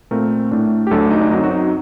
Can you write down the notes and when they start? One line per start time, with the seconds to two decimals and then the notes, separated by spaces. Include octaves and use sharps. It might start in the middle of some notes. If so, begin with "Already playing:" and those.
0.11 A#2 A3 C4 A#4
0.51 A2 A3 D4
0.87 G4
0.91 D2 D3 F#3 A3 D4 A4
1.11 D#4
1.21 D4
1.30 F#2 F#3 C4 D#4
1.44 F#4
1.51 D#4